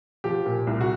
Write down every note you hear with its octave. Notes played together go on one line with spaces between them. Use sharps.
F3 G4
A#2
C2
F#4